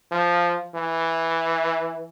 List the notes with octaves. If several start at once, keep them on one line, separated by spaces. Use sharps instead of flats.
F3
E3